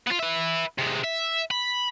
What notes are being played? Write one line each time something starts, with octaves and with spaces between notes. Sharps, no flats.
B3 F4
B4 E5
C3 G#3
E5
B5